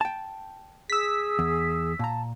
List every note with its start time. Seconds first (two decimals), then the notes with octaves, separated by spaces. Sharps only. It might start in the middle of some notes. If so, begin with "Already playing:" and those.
0.01 G5 A5
0.90 G#4 E6 B6
1.39 E2
1.99 A#2 A5 A#5